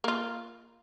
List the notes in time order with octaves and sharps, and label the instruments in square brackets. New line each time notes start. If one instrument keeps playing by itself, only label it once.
[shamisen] A#3 F4